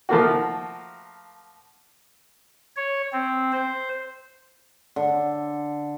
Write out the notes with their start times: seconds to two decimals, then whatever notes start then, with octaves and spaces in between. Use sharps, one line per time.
0.09 F3 A3 A#3 F#4
2.76 C#5
3.12 C4
3.52 C5
4.96 D3